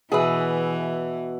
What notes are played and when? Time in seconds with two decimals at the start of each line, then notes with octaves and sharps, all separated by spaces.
0.12 B2 E3 G#4 B4 E5